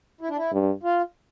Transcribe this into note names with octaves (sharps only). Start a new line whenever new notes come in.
E4
D4
E4
G2
F4